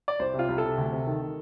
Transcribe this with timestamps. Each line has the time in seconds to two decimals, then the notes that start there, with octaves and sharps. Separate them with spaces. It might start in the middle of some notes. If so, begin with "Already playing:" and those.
0.08 D5
0.19 C2 C5
0.33 C3
0.39 F4
0.48 C2
0.58 A4
0.63 C3
0.78 D2
0.92 C3
1.06 D#3
1.21 D#3